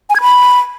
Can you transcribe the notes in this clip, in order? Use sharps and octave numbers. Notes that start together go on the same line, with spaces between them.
G#5
G#6
B5